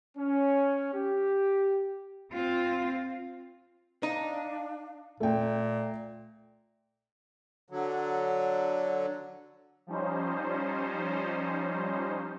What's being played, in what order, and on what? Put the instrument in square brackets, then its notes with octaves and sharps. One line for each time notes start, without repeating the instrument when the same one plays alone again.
[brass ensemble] C#4
G4
[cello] C4 F4
[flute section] D4 F5 [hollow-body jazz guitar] D#4
[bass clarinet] A#2 [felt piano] A3 G5
[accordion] D3 F#3
[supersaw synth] F3 G3 C#4 D#4 C5